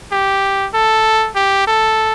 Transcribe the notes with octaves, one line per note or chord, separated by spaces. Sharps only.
G4
A4
G4
A4